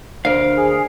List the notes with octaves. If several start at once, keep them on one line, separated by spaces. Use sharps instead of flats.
D2 A#4 C5 F5
G#4